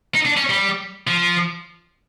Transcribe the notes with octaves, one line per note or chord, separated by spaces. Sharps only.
D#4
D4
C#4
G3
F3